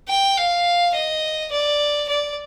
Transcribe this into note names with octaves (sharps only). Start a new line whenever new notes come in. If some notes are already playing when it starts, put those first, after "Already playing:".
G5
F5
D#5
D5
D5